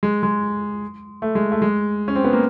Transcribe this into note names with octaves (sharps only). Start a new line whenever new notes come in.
G#3
G#3
A3
G#3
A3
G#3
C#4
C4
B3
A#3